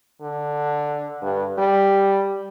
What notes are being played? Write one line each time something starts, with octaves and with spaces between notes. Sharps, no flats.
D3
G2
G3